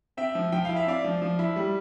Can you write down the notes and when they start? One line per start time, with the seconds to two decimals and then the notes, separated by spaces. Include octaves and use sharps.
0.17 C4 E5 G5
0.35 F3
0.52 F3 G5
0.65 E4 F5
0.76 E5
0.87 C4 D5 F5
1.04 F3
1.22 F3
1.39 E4
1.56 G3